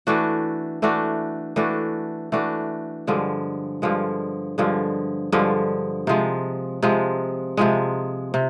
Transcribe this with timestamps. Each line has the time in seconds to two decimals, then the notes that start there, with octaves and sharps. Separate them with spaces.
0.07 E3 A3 D4 F#4
0.82 E3 A3 D4 F#4
1.56 E3 A3 D4 F#4
2.32 E3 A3 D4 F#4
3.07 G2 D3 F3 G#3
3.82 G2 D3 F3 G#3
4.58 G2 D3 F3 G#3
5.32 G2 D3 F3 G#3
6.07 C3 F3 G#3
6.83 C3 F3 G#3
7.57 C3 F3 G#3
8.34 C3